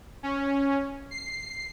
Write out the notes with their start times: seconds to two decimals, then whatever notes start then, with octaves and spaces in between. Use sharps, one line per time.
0.23 C#4
1.11 C7